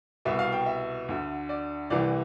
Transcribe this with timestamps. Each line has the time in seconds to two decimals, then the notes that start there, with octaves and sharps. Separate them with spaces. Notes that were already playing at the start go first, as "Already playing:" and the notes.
0.25 C2 B2 E5
0.39 F5
0.52 G5
0.66 E5
1.08 D2 D3
1.49 D5
1.90 C2 C3 E3 D5